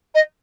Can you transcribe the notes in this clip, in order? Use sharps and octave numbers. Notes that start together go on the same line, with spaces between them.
D#5